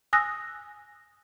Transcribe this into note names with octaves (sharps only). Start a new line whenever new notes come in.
G#5 D#6 E6 F#6 A#6